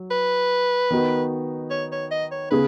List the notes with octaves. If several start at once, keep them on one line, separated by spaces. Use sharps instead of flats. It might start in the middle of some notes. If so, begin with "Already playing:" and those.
Already playing: F#3
B4
D#3 B3 D#4 F#4
C#5
C#5
D#5
C#5
C#3 B3 G#4 B4